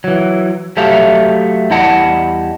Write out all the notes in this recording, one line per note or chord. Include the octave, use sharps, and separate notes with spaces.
E3 F#3
F#3 A3 G4 A4 E5 F5
E2 G3 E4 D#5 F#5 A5